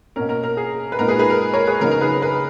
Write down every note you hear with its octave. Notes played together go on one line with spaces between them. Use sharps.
B2 A#3 C#4 A#4
A#4
A#4
G#4
B4
A#2 G#3 B3 D#4 A#4
G#4 B4
G#4 B4
A#4
A#4 C#5
G#4 B4
C#3 F#3 B3 D#4 A#4
A#4
G#4 B4
G#4 B4